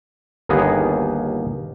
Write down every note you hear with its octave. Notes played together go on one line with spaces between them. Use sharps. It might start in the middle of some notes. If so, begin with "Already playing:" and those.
G1 D#2 A#3 B3 D#4 G#4